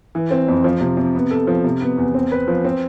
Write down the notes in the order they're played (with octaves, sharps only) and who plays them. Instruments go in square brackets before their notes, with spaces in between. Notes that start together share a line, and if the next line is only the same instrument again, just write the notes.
[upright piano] E3
C4
F2
F3
C3
C3
B3
A4
F3
C3
B3
E2
C4
B4
F3
C4